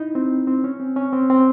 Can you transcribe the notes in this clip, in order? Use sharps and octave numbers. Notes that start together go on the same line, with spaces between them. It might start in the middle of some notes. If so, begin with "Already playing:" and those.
Already playing: D#4 E4
C4
C4
C#4
C4
C#4
C4
C4